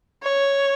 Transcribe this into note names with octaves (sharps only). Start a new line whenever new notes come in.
C#5